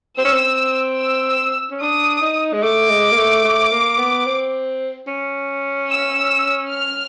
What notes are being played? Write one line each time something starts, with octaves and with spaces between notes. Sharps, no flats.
C4 E6
C#4
C4
E6
C#4
D4 D#6
D#4
G#3
A3 D6
G#3
A#3
A3
A3
A#3
B3
C4
C#4
E6
F6